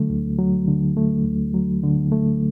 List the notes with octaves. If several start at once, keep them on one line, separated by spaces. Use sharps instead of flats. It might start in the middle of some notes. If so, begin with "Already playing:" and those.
Already playing: D3 F#3 A3
D2
F#3
D3
A3
D2
F#3
D3
A3